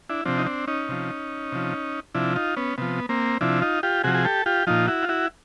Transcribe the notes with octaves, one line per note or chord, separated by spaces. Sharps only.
D4 E4
C3 F3 C4 D4
D#4
C4 D4
C#4 D#4
C3 F3
C3 F3
C3 F3 D4 E4
D#4 F4
B3 C#4
C3 F3 B3
A#3 C4
C3 F3 D4 E4
D#4 F4
F4 G4
C3 F3 F#4 G#4
G#4
G4 A4
F4 G4
A#2 F3 D#4 F4
E4 F#4
F4
E4 F#4